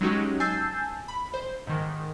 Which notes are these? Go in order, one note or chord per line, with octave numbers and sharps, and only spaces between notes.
F#3 G#3 C#4 D#4 F#4 G4
G#5 A5 E6 G6 A6 C7
B5
C5
G#2 D#3